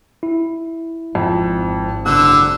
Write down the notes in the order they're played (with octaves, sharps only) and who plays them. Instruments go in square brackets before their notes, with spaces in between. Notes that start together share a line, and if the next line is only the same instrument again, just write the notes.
[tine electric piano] E4
[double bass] G#1 [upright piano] F2
[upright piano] F#1 F#6 [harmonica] D3 E6